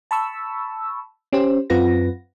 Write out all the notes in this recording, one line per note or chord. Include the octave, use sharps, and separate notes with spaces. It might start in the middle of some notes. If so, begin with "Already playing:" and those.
A5 B5 C#6 E6
C#4 G4 C5
F#2 C4 F4 B4 F#5 A#6